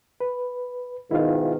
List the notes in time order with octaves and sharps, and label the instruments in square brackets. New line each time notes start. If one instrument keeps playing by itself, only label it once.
[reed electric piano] B4
[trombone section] G#2 B2 D#3 [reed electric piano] E4 F4 F5